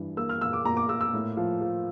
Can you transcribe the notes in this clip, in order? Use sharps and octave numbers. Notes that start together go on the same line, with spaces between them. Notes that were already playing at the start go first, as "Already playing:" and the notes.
Already playing: G2 E3
A#3 E6
F6
A#2 E6
D6
A#2 A#5
D6
A#3 E6
E6
A2
F3
F3